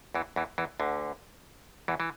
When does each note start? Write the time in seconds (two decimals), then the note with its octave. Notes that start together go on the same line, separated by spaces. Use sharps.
0.15 E2 E3
0.36 E2 E3
0.58 E2 E3
0.80 D2 D3
1.88 E2 E3
2.00 E3